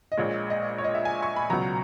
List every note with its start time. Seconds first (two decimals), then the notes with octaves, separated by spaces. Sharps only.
0.12 D#5
0.17 A#1 A#2 G#3 C#5
0.50 D#5
0.78 C#5
0.84 D#5
0.95 E5
1.05 G#5
1.23 C#6
1.36 B5
1.50 C#2 B2 F#3 A#5